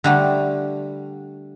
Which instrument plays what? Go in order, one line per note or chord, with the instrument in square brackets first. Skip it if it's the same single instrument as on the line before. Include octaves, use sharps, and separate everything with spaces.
[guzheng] D3 G3 A3